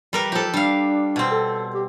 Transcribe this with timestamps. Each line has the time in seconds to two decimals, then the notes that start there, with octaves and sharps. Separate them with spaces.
0.13 G3 A#4 B4
0.32 F3 G4 A4
0.54 G3 D4 F5
1.16 B2 C4
1.31 A4
1.74 G4